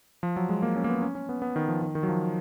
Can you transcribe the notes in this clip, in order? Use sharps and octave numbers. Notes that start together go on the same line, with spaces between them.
F3
F#3
G#3
A#3
C#4
A#3
B3
C#4
C#4
B3
B3
D#3
F3
D#3
D#3
F#3
F3